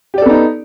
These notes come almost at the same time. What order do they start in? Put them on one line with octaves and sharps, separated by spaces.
G4 D5 A4 B3 D#4